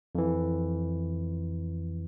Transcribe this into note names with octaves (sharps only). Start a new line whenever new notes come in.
F2 E3